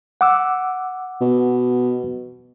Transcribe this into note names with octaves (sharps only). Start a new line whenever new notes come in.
F#5 D6 E6
B2